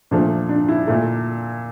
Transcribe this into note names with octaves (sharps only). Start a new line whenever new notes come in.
A#2 F3 A3 D4
D4
E4
A#2 A3